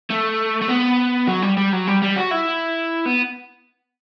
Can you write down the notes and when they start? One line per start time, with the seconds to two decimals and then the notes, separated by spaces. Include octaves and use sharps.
0.10 A3
0.62 A3
0.69 B3
1.28 F#3
1.42 G3
1.57 G3
1.72 F#3
1.87 G3
2.02 G3
2.16 F#4
2.31 E4
3.06 B3